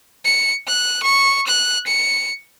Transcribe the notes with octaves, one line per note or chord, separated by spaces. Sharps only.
C#7
F#6
C#6
F#6
C#7